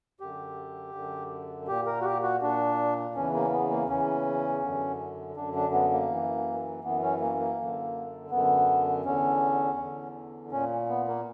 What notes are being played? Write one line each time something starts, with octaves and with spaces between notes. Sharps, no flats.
F#2 D3 G4
F#2 D3
A#2 G4
A#4
F#4
G4
F#4
A#2 D4
E2 C#3 E3 C#4
A#3
B3
A#3
E2 C#3 E3 C#4
F#2 D3
F#2 D3 D4
D4
B3
A#3
F#2 E3
F#2 E3 B3
C#4
A#3
A#3
F#2 D3
F#2 D3 B3
E2 D3 C#4
E2 D3
A#2 C#4
B3
A#3